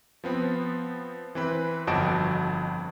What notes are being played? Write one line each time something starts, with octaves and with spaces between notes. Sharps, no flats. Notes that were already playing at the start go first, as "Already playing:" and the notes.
F3 B3 C4
E3 C4 B4
G1 F2 F#4 D#5 A5 D7